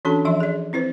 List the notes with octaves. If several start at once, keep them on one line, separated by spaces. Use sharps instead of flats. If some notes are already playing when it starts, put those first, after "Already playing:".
E3 C#4 D4 F#4 A4 A5
E3 F3 E5 C6
G#4 D5
C4 E4 B4 C5